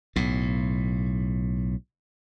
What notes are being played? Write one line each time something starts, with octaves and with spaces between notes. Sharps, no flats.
B1 A2